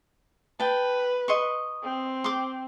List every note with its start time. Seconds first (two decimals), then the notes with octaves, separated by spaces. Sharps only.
0.60 B4 G5 A5
1.28 D#5 C6 C#6
1.83 C4
2.24 C6 D6